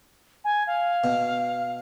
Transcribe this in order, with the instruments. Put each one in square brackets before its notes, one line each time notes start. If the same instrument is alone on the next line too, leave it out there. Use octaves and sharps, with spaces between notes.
[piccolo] G#5
F5
[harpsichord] B2